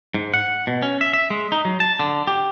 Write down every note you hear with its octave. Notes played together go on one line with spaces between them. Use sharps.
G#2
F#5
B2
C#4
E5
E5
G#3
D#4
F#3
A5
D3
G4